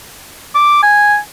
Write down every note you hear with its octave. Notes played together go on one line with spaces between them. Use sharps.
D6
G#5